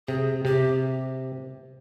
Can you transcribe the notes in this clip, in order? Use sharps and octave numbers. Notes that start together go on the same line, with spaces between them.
C3 G#4
C3 G4